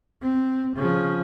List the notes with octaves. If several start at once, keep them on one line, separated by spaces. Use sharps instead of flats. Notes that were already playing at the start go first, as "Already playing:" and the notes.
C4
C#3 F3